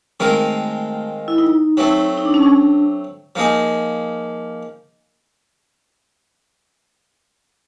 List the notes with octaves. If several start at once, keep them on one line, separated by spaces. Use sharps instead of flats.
D#3 G#3 A3 C4 F4 A#4
E4
D#4
F#3 A3 C4
D#4
D4
C#4
D4
F3 A#3 D#4 G#4